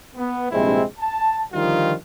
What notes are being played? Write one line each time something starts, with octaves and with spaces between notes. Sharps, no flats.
B3
A#1 G2 C3 G#3 C4 E4
A5
D3 D#3 F3 G3 D#4 F4